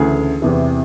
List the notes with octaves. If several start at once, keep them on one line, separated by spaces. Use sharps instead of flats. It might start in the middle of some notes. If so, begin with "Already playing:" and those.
Already playing: D2 C#3 E3 G#4
E2 C3 E3